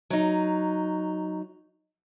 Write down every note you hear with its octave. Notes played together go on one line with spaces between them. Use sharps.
F#3 D#4